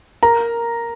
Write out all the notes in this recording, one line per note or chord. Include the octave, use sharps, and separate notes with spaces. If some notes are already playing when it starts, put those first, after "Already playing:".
A#4 A#5